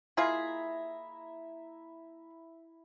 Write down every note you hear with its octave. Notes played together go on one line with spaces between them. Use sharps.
A#3 E4 F4 G#4 E5 A#5